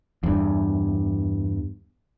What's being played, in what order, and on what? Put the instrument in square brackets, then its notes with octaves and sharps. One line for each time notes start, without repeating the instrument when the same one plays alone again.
[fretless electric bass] E2 G2